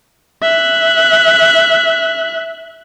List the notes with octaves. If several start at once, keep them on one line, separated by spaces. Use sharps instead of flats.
E5 F#6